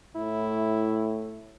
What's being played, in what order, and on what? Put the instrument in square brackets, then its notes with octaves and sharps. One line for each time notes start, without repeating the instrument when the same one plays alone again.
[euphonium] A2 [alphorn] E4